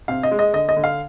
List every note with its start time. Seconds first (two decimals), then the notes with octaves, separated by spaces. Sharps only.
0.08 C3 F5
0.23 D#5
0.31 G#3
0.39 D#5
0.53 D3 D#5
0.69 D#5
0.76 D3
0.84 F5